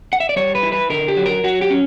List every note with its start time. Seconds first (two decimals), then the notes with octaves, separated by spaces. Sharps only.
0.13 F#5
0.20 E5
0.29 D5
0.36 G3 C#5
0.55 B4
0.63 E4
0.72 B4
0.90 D3 A#4
1.08 G4
1.17 F#3
1.26 A#4
1.44 F#3 F#4
1.61 G4
1.70 C#4